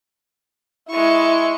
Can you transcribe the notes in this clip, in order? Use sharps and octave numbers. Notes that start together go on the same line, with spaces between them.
G#3 E4 C#6